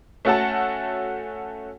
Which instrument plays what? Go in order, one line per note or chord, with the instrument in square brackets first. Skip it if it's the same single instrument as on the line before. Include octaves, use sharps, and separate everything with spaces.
[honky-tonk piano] A3 C#4 F#4 A4 F#5 A5